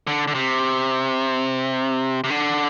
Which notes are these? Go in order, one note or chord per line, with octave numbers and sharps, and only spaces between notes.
D3
D3
C3
C3
D3